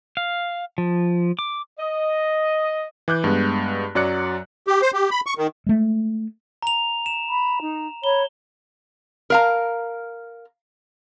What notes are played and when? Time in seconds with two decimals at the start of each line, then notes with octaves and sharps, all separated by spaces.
0.17 F5
0.78 F3
1.39 D6
1.80 D#5
3.08 E3 D6 F#6 G6
3.24 G2 G#3 B3
3.95 F#2 F#3 D5 F#6 C#7
4.67 G4
4.82 C5
4.94 G4
5.11 B5
5.26 C#6
5.38 D#3
5.67 G#3 A3
6.62 A#5 F7
7.06 E7
7.28 B5
7.60 D#4
8.04 C#5 A#5 B5 G7
9.30 A#4 F5 A#5